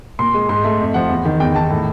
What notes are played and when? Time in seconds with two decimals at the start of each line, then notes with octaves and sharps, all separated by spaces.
0.19 A#2 C6
0.34 G#3
0.49 G#2 C6
0.65 A3
0.80 F2
0.94 F3 F#5
1.10 E2
1.25 D#3
1.40 E2 G5
1.55 D#3 A5
1.70 A2